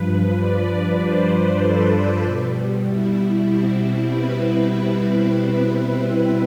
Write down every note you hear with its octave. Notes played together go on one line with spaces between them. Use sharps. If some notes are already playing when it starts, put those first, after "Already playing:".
Already playing: G2 F3 B4
D5
C5
A4
B2 G3
E4
C4
B4